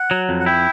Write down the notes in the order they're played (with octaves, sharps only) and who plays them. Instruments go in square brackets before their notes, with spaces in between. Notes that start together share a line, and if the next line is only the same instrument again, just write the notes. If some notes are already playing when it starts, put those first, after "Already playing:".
Already playing: [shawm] F#5
[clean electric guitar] F#3
F2
[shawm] F#5
[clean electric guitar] E4 [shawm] G5